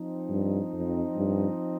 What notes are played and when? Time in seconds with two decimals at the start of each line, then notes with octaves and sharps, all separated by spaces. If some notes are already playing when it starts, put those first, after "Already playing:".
Already playing: F3 C4 D#4
0.30 G2
0.73 F2
1.16 G2